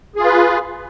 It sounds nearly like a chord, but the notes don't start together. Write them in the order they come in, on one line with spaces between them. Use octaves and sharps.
G#4 F4 B4